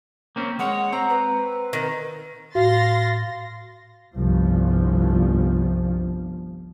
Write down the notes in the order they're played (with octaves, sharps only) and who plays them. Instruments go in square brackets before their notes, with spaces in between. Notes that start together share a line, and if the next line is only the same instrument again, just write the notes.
[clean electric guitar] A#3 C4 C#4
[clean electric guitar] G#3 C#5 [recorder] F#5
[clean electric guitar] C4 [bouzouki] A#5
[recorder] B4
[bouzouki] D#3
[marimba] A2 [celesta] F#4 [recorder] F5 [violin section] C6 A6 A#6
[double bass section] G1 C2 G2 F3